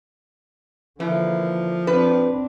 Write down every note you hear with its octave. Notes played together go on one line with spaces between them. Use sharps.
D3 E3 F3 A#3
C4 D4 B4